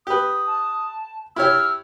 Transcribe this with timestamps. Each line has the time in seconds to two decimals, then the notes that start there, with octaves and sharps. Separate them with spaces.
0.07 G4 B4 D#6
0.47 A5
1.36 E4 G4 C#5 E6 F6